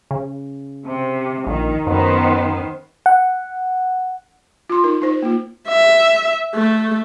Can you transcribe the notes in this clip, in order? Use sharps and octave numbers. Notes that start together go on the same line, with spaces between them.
C#3
C3
A#1 D#3
F#2 D#3 B3 C5
F#5
F4 C6
D#4 A#4
D#4 C5
A#3 F4
E5
A3